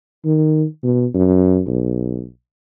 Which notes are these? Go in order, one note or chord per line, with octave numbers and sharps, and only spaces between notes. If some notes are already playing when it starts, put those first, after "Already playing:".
D#3
B2
F#2
B1